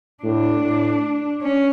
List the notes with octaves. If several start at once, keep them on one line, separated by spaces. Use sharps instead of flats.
A2 D4
A2
C#4